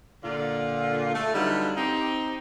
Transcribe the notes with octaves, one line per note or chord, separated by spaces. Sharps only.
A#2 D3 F4
A3
D3 F#3 G3 B3 D#4 F4
C4 D#4 G4